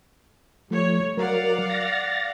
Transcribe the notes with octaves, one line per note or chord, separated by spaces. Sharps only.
F3 G3 A3 C#5
F#3 A#4 D5 F5 F#5
A6 A#6